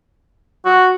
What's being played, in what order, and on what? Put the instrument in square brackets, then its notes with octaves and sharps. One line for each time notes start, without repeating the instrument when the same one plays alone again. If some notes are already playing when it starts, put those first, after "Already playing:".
[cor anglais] F#4